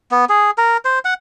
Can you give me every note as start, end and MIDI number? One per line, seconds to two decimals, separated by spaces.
0.11 0.25 59
0.29 0.51 68
0.58 0.77 70
0.85 0.99 72
1.05 1.14 78